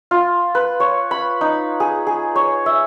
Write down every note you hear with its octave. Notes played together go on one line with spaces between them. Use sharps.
F4
B4
C#5
B5
D#4
G#4
G#4
C#5
E5